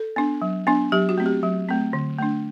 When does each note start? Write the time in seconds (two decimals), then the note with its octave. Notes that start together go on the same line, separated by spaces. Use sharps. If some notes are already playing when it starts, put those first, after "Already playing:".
Already playing: A4
0.16 B3 D4
0.42 F#3
0.67 B3 D4
0.92 F#3 G4
1.09 F#4
1.18 A3 C4
1.26 G4
1.43 F#3
1.68 A3 C4
1.93 D3
2.18 A3 D4